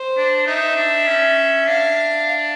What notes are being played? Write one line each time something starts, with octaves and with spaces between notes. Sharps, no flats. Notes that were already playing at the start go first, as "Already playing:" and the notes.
Already playing: C5
D4
D#4 E5
D4
C#4
D4 F5